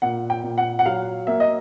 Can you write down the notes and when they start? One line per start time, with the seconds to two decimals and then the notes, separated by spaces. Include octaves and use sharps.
0.02 A#2 F#5
0.30 G5
0.43 A#2
0.58 F#5
0.79 F#5
0.86 F#3 F5
1.27 A#3 E5
1.40 D#5